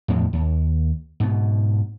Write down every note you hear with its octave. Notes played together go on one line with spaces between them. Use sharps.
E2 A2 F3 G#3
D#2
G#2 B2